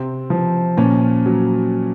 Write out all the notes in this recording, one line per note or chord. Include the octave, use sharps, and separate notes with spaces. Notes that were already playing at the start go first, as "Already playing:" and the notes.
Already playing: C3 C4
F3
A#2 C#4
F#3